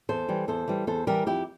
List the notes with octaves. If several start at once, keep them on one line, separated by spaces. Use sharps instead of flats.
E2 A4 C5
E3 G3
E2 A4 C5
E3 G3
E2 A4 C5
E3 G3 G4 A#4
F2 E4 G4